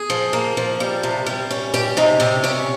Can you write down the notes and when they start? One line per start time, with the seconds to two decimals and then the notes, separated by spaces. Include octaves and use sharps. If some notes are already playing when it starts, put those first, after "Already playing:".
Already playing: G#4
0.10 F3
0.33 A#3
0.57 F3
0.80 G3
1.03 C3
1.26 G3
1.51 C#4
1.74 G3 G4
1.97 C3 D#4
2.20 C3 G4
2.44 C#4 G4